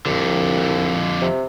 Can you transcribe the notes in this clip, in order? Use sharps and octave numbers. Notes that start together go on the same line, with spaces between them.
C2 F2 D3
C3